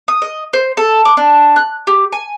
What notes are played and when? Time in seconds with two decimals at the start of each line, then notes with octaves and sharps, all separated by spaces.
0.08 D#6
0.22 D#5
0.53 C5
0.77 A4
1.05 D6
1.17 D4
1.56 F#6
1.87 G4
2.12 G#5